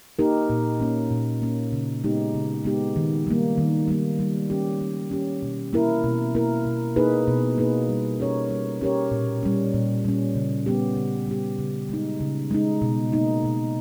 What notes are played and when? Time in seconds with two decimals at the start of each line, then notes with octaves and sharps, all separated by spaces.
0.19 A#3 D#4 G4 A#4
0.50 A#2
0.80 A#3 C#4
1.11 A#2
1.42 A#3 C#4
1.72 C#3
2.04 G#3 B3 D#4 G4
2.34 C#3
2.64 G#3 B3 D#4 G4
2.96 D#3
3.27 G3 A#3
3.58 D#3
3.88 G3 A#3
4.19 G3
4.50 C#4 G4
4.81 G3
5.11 C#4 G4
5.42 B2
5.73 A#3 E4 A#4
6.04 B2
6.35 A#3 E4 A#4
6.65 B2
6.96 A#3 D#4 G#4 B4
7.27 B2
7.58 A#3 D#4 G#4 B4
7.89 G3
8.20 C#4 G4 A#4 C#5
8.50 G3
8.81 C#4 G4 A#4 C#5
9.11 A#2
9.43 G3 C#4
9.74 A#2
10.05 G3 C#4
10.35 C#3
10.66 G3 B3 G4
10.97 C#3
11.27 G3 B3 G4
11.59 C#3
11.89 G#3 D#4
12.20 C#3
12.51 G#3 D#4
12.81 B2
13.12 A#3 D#4
13.44 B2